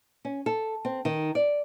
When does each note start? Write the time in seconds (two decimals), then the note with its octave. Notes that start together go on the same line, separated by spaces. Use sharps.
0.25 C#4
0.46 A4
0.85 C4
1.05 D#3
1.35 D5